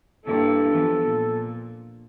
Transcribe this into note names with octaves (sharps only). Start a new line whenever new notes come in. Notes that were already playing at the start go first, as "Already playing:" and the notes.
G2 A#3 E4 A4
E3 F3 B3
A#2